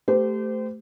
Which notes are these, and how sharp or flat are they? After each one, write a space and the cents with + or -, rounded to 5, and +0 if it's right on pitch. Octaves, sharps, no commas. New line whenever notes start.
A3 +0 G4 +0 C5 -35